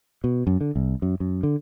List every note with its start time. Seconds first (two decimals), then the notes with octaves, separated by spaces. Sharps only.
0.24 B2
0.47 F#2
0.61 D3
0.76 C2
1.02 F#2
1.20 F#2
1.43 D3